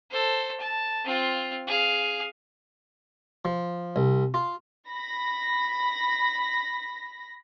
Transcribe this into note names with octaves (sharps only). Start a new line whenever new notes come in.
A4 C5
A5
C4 F4
G#4 F5
F3
C2
F4
B5 A#6